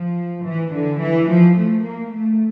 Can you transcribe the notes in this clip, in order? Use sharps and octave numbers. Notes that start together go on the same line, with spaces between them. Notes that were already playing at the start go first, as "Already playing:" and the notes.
Already playing: F3
E3
D3
E3
F3
A3
A#3
A3